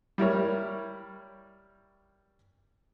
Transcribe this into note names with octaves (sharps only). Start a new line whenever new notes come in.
G3 E4 A#4 C#5